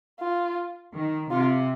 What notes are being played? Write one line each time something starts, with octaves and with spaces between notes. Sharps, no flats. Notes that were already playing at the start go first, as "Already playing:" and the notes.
F4
D#3
C3 F4